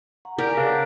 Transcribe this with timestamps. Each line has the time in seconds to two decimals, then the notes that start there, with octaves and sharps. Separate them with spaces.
0.25 F#5 A#5 C#6
0.38 G4 A#4 D5 G#5
0.57 C#3 D4 B4 F#5 G5